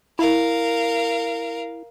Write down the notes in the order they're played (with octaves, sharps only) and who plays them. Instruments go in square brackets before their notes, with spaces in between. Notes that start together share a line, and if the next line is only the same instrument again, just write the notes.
[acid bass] E4 [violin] A#4 F5